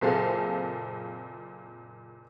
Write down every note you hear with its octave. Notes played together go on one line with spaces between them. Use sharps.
F#1 A#2 C4 G#4 A4 F5